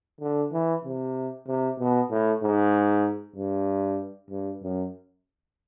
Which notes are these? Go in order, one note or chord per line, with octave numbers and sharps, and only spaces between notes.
D3
E3
C3
C3
B2
A2
G#2
G2
G2
F#2